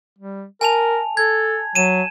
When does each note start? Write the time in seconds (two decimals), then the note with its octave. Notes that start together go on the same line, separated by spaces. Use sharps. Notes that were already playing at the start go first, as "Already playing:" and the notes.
0.19 G3
0.61 A#4 G#5 A5 F7
1.17 A4 G#6
1.75 F#3 D#7 E7